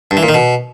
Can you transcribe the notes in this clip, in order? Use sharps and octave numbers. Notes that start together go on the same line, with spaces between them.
G2
E3
A#2
D#3
B2